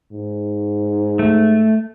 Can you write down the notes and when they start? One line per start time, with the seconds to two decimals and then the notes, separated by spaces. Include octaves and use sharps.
0.13 G#2
1.19 A3